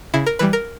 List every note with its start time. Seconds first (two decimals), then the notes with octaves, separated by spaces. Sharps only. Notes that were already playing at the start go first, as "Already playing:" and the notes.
0.14 C#3 E4
0.26 A#4
0.39 E3 G3 B4
0.53 A#4